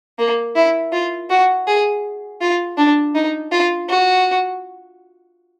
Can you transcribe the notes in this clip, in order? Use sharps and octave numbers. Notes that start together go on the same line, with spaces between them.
A#3
E4
F4
F#4
G#4
F4
D4
D#4
F4
F#4